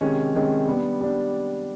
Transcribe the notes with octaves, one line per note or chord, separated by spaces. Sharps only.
C3 D#3 G#3 C#4
C3 D#3 G#3 C#4
G3 B3 D4
G3 B3 D4